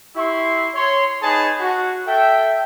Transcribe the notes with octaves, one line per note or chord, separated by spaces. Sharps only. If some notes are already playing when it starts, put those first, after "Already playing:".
E4 G4 E5 C6 C#6
C#5 C6
D#4 G#4 B4 C#5 G#5 A5
F#4
A4 E5 G5